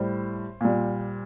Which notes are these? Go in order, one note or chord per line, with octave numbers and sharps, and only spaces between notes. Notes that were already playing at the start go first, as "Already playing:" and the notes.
Already playing: A2 G3 C5
A#2 G3